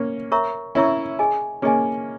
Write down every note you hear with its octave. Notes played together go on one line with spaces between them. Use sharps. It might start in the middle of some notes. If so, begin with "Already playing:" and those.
Already playing: A#3 C#4
A#4 C#5 E5 A#5 C#6
C#4 E4 A#4 C#5 E5 A#5 C#6
G#4 D#5 G#5
A#3 C#4 G#4 D#5 G#5